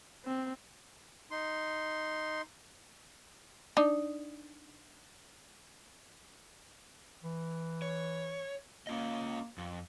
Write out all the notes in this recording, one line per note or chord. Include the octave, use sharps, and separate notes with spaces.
C4
D#4 C6
D4 D#4
E3
C#5
A#3 C#4 F4 D#5
F2